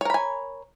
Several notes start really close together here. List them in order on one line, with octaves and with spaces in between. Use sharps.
C#5 A#4 B5 G#5